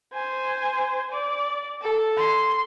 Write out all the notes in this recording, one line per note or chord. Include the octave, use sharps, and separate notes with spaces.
C5 G#5
D5
A4
C6